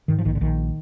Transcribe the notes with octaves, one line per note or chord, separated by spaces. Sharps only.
G#2 D#3
F3
A#1 D#3
D3
A#1 D#3